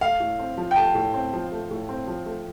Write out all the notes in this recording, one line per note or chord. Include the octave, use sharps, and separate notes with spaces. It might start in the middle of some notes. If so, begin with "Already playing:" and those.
A3 F5
A2
C4
F3
G5
A3 A5
A2
C4
F3
A3
A2
C4
F3
A3